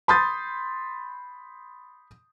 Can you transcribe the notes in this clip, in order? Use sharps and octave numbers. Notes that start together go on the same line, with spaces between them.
B5 C6 D#6 G6 A6